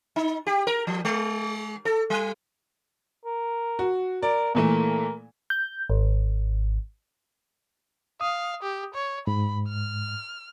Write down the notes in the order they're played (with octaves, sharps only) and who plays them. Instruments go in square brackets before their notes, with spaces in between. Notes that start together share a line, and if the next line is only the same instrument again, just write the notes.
[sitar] D#4
G4
A#4
F3
G#3
A4
G3
[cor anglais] A#4
[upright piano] F#4
[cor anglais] A#4 [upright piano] D5
[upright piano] A#2 E3 A3 [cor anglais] A#4
[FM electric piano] G6
G#1
[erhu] F5 [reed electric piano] D#6
[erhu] G4
C#5
[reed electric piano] G#2 [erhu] B5
[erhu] F6